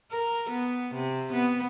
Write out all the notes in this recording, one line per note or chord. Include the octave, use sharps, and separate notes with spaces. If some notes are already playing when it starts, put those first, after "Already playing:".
A#4
B3
C3
B3